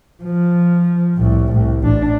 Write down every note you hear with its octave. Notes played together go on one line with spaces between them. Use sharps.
F3
C2 A2
C2
A1 D4